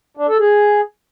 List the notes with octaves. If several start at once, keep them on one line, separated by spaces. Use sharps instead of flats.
D4
A4
G#4